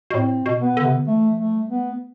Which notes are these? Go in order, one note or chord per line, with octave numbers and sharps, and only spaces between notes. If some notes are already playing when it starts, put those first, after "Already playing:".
B2
A2 C4
B2
B3
D3
C3
D3
E3 A3
F3
A3
G3
B3
A3